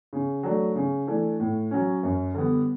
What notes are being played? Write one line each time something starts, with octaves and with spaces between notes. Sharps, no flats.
C#3
F#3 A3 D4
C#3
E3 A3 D4 A4
A2
F#3 C#4
F#2
D3 G3 B3